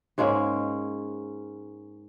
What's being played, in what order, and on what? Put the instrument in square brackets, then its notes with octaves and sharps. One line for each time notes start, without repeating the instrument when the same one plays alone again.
[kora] G#2 G#3 A#3 C#4